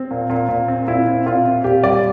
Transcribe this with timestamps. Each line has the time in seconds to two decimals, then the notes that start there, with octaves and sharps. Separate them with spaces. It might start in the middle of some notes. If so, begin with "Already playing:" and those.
Already playing: C4
0.11 A#2
0.30 A#2
0.49 A#2
0.68 C4
0.87 A#2 E4
1.07 C4
1.26 A#2 F4
1.45 C4
1.64 A#2 G4
1.83 G3 D5